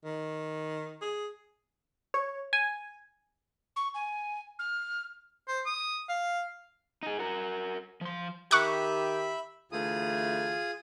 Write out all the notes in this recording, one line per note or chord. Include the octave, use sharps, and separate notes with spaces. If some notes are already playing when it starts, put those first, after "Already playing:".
D#3
G#4
C#5
G#5
C#6
G#5
F6
C5
D#6
F5
D#4 G#4
F#4 A#4
F3 C6
D#3 G4 E5 B5 C#6 F#6
D2 E3 A3 F4 G#4 D#6